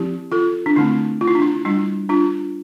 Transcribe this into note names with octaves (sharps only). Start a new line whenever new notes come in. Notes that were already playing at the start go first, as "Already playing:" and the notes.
Already playing: F3 C4 E4 G4
F4 A4
D4
D3 A3 C4 E4
F4
E4
D4
E4
G3 D4 E4
D4 F4